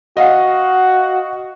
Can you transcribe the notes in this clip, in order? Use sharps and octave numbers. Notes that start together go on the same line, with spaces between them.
F#4 D#5 F5 F#5